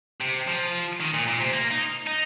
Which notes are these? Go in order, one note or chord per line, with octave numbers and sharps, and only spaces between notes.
C3
F3
D#3
A#2
A#2
C3
A#3
D#4
D#4